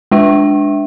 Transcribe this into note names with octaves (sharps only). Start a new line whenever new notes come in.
G#3 D4 E5